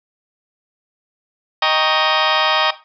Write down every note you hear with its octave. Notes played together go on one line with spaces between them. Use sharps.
D#5 G5 A#5 C#6 D#6